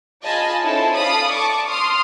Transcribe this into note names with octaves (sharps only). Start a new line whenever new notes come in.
F4 G#4 D#5 G#5 A5 B5
C#4 D#4 E4 A4 C5 A5
A4 D5 F5 B5 D#6
A5 C#6 D6
C6 D#6 F6